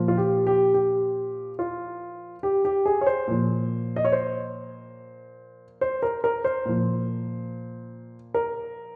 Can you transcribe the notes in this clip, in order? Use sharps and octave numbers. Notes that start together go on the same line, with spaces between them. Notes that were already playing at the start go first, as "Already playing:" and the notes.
Already playing: A#2 F3
F4
G4
G4
G4
F4
G4
G4
G#4
C#5
C5
A#2 F3
D#5
C#5
C5
C5
A#4
A#4
C5
A#2 F3
A#4